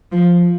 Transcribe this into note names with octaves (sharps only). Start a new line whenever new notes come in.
F3